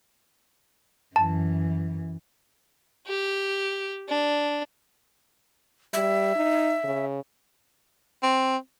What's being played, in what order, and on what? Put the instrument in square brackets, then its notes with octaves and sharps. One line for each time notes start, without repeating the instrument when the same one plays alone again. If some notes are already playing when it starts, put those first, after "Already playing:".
[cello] F#2 E3 [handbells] A5
[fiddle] G4
D4
[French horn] G3 [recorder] E5
[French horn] D#4
C#3
[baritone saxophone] C4